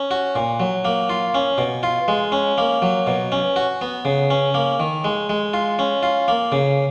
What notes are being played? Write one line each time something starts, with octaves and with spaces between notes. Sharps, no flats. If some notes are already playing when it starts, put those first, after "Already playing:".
Already playing: C#4
F#4
A#2
F#3
A#3
F4
C#4
B2
F4
G#3
C#4
A#3
F#3
B2
C#4
F#4
B3
C#3
C#4
A#3
D#3
G#3
G#3
F4
C#4
F4
A#3
C#3